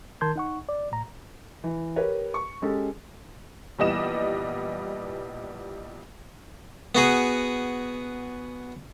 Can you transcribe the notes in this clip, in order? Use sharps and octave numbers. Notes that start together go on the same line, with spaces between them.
D#3 A#4 A5 C6 G6 G#6
D#4 F#5 C#6
D5
A2 A#5
E3
G4 A#4 B4 C#5
C#6
G#3 C#4 G4 A4
A#1 E3 G3 B3 D#5 E7
B3 F#4 G#4